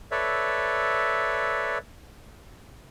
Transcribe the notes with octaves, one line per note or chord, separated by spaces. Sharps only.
A4 B4 C#5 D5 E5